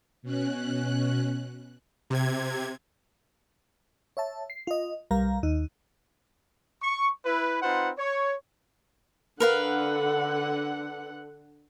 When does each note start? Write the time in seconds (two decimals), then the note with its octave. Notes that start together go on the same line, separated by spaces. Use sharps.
0.22 B2 C#4 F#6
2.10 C3 G#6
4.17 C#5 E5 A5
4.50 C7
4.67 F4 D#5
5.11 B1 G3 A#4 F5 A#5
5.43 D#2 D#4
6.82 C#6
7.25 E4 B4
7.62 C4 D#4 F4 B4 C5 F#5
7.98 C#5
9.40 D3 A#4 B4 F5 F#5